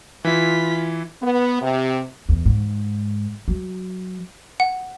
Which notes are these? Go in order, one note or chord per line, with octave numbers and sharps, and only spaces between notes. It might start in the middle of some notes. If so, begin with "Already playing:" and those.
E3 E4 F4 B6
B3
C3
E2
G#2
F#3
F#5